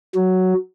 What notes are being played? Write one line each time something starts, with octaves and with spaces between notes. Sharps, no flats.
F#3